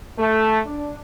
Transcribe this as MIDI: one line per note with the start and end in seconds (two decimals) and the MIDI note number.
0.19 0.59 57
0.67 0.98 62